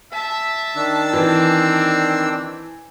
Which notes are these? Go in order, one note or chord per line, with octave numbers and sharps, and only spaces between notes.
E5 A5
D#3 D4 E6
E3 C4